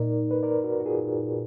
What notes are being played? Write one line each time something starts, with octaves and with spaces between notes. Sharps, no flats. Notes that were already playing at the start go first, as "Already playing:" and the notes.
Already playing: A#2 D#4 A#4 D5
B4
A#4 D5
F#4 A#4
F#4
F4 G#4